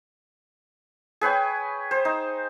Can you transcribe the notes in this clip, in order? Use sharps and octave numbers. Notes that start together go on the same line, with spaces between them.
G#4 B4 C#5 G5
C5
D#4